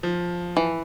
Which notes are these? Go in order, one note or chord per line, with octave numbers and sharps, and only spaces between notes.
F3
E3